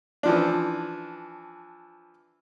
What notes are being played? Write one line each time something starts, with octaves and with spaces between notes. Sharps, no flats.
E3 F3 D4